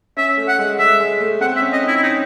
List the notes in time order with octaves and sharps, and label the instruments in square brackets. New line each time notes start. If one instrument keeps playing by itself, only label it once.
[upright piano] C#4 [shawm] E5
[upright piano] A3
[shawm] F#5
[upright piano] G#3
[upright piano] G#3 [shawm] E5
[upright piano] G#3
A3
[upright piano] C4 [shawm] F#5
[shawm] E5
[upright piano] C#4
[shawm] D#5
[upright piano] D#4 [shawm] E4
[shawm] E4
[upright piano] C#4 [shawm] D#4